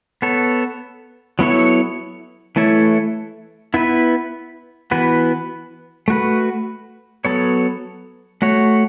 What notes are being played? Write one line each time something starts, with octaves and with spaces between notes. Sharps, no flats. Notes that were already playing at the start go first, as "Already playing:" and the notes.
B3 A4 C#5
F#3 B3 E4 A4 C#5
E3 A3 E4 A4 C#5
B3 E4 B4
E3 B3 F#4 B4
A3 F#4 B4
F#3 B3 A4 C#5
A3 F#4 C#5